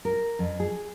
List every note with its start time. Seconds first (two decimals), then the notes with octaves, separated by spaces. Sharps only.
0.05 A#4
0.39 F2
0.60 G#4